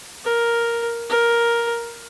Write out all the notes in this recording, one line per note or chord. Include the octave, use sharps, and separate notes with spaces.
A#4
A#4